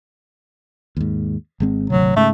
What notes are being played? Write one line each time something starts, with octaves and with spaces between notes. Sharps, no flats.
D#2 G#2
G#1 G#3 C4
G#1 D2 C3 F#3
G#2 C#3 A3